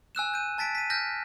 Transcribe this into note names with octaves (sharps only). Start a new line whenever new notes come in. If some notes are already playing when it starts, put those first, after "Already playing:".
G#5 E6 F#6 E7
G6 D#7
A5 A6 B6 D7
B6 D#7
F6 G6 A#6